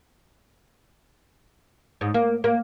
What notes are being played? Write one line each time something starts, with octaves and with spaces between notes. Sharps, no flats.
G#2
A#3
A#3